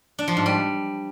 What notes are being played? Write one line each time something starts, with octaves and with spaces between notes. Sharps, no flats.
D4
F3
G#2
G3